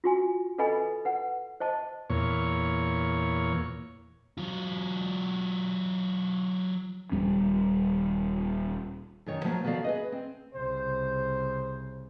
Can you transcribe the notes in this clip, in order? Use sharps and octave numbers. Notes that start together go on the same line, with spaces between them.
F4 F#4 G#5
A4 B4 D#5 G#5 B5
B4 F#5
C5 D#5 A5
E2 A#2 C#5
F#3 F4
D#1 G2 G3 C#4
F#2 D#3 C#5
F3 F#3 A#3
D#3 B3 F#4 A4 D5 F5
G#4 B4 D#5
C4
C2 C#3 C5